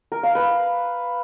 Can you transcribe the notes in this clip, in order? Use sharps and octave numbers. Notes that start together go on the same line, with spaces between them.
A#4
F5
B4